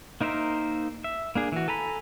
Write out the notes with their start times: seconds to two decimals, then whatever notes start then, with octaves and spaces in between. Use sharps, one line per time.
0.21 A#3 D#4 A#4 C5 E5
1.04 E5
1.35 A#3 D4 G#4
1.52 E3 F#4
1.68 A4 G#5 A#5 B5